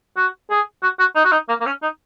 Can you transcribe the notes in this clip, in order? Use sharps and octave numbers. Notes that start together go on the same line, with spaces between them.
F#4
G#4
F#4
F#4
D#4
F#4
D#4
A#3
A#3
C#4
D#4